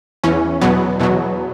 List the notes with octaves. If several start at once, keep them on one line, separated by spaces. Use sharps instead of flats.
E2 E3 C#4
E2 B2 F#3 B3
E2 B2 F#3